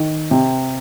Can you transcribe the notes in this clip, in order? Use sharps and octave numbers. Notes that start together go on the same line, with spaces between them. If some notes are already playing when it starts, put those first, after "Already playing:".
Already playing: D#3
C3